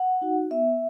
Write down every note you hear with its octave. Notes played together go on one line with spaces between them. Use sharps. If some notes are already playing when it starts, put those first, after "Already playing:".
Already playing: F#5
D#4 F#4
B3 E5